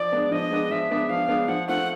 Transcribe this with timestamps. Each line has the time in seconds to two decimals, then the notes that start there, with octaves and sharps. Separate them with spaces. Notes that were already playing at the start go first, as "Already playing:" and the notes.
Already playing: F3 D5
0.12 G#3 B3 D4
0.31 F3 D#5
0.51 G#3 B3 D4
0.71 F3 E5
0.89 G#3 B3 D4
1.09 F3 F5
1.28 G#3 B3 D4
1.48 F3 F#5
1.67 A3 C4 F4 F#5